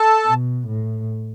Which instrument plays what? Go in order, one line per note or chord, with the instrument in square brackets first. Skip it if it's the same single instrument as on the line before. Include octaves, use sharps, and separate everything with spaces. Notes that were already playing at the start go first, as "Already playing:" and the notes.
Already playing: [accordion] A4 A5
[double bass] B2
A2